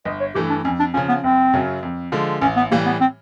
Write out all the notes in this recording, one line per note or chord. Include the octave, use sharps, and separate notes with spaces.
G1 D#5
C#5
G2 E3 A3 G4
D4
F2 C#4
D4
C#3 F3 C#4
B3
F#1 C4
F#2 C#3 F#3
F2
D3 F3 G#3
A1 C#4
B3
A2 E3 G3 A#3
B3
C4